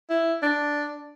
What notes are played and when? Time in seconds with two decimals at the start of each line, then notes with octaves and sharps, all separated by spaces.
0.10 E4
0.42 D4